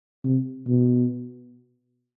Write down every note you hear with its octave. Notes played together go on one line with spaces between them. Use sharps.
C3
B2